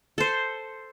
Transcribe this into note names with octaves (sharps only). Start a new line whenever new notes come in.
A4 C5